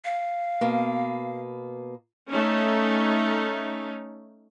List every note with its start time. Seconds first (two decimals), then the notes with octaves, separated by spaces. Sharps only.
0.05 F5
0.61 B2 A#3
2.30 A3 C#4 D#4